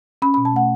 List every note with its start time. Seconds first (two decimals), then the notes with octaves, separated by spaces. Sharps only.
0.22 C#4 B5
0.34 B5
0.37 B2
0.45 A5
0.53 A3 F#5